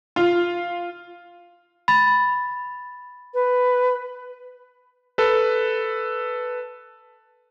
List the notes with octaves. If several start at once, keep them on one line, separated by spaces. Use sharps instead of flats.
F4
B5 A6
B4
A4 B4